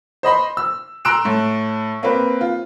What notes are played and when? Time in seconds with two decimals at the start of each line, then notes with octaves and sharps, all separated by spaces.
0.23 C5 D#5 B5 C6
0.57 E6
1.05 A#5 C6 E6 F#6 D7 E7
1.25 A2
2.03 A#3 C4 B4
2.41 F4